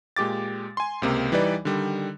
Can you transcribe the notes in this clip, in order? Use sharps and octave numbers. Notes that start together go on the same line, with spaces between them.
A#2 G#3 G4 D6 A6
G#5 C6
C#2 C3 A#3
E3 G3 D#4 B4 D5
D3 D#3 G3